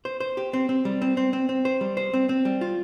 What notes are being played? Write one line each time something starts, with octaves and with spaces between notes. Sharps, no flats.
C5
C5
G4
C4
C4
G3
C4
C4
C4
C4
C5
G3
C5
C4
C4
G3
F4